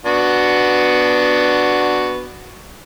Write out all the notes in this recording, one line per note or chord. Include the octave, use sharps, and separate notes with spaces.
B3 D4 F#4